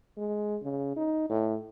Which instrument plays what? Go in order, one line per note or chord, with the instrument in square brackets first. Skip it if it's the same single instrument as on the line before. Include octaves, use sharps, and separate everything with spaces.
[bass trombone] G#3
C#3
D#4
A2